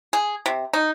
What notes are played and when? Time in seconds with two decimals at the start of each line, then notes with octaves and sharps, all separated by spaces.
0.13 G#4
0.46 C3
0.73 D#4